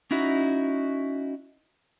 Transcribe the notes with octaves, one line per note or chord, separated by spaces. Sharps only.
C#4 D#4 E4 F#4